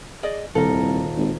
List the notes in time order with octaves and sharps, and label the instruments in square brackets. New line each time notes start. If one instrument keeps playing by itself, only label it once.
[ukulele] G#4 D5 D#5
[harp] D#1 F5 A#5 [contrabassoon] C2 [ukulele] A4
[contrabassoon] G#1